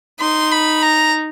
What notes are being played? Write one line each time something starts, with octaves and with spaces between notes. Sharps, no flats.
D#4 C6
B5
A#5